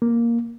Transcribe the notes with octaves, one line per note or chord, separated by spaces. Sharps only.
A#3